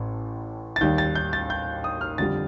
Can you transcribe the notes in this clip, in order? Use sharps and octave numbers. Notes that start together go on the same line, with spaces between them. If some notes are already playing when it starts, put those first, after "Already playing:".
Already playing: A1 A2
A6
D#2 D#3 G3 G6
A6
G6
A6
G6
D#6
F6
F2 D3 G3 A6